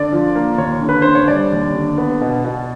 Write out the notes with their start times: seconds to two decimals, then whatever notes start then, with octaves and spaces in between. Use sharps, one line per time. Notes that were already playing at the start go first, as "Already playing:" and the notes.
Already playing: D3 D5
0.12 F3
0.35 A#3
0.58 D#2 C#5
0.82 D3
0.89 B4
1.02 D3 C5
1.15 C#5
1.28 G3 D5
1.52 D#2
1.75 D3
1.98 B3
2.21 B2
2.45 B2